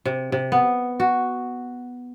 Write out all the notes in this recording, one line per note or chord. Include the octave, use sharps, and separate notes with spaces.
C3
C3
B3
F#4